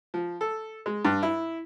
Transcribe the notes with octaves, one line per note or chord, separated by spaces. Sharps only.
F3
A4
G#3
G2
E4